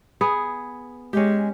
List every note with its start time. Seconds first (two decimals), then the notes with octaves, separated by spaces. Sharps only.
0.21 B3 G#4
1.13 G#3 C#4 G4